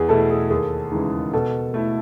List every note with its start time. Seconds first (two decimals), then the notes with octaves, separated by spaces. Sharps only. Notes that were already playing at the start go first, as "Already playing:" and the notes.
Already playing: E2 G#4
0.09 B2 A3 E4 A4
0.30 G#4
0.50 D#2 G#4
0.92 C#3 E3 G#3 D#4
1.33 B2 A4
1.74 A3 E4